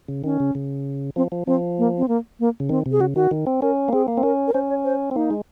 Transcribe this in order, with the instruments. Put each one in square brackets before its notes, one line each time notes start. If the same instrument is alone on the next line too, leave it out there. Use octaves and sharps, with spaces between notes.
[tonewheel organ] C#3
[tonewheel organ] D#3 [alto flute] C#4
[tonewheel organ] C#3
C#3
[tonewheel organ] F3 [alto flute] C4
[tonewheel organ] F3
[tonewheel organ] F3 [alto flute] C4
[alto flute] A#3
C4
A#3
A#3
[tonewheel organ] C#3
[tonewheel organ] D#3 [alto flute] C4
[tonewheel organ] C3
[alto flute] G#4
[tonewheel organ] C#3 [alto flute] F#4
[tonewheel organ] D#3 [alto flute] F#4
[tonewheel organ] D#3
C4
[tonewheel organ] C#4 [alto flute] A#4
[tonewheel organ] A#3
[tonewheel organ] C4 [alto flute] G#4
[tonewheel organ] A#3
C4
[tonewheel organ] C#4 [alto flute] A#4
[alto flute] A#4
[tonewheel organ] C#4 [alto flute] C5
[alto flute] C#5
C5
[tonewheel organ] C4
[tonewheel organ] A#3 [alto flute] D#4
[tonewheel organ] G#3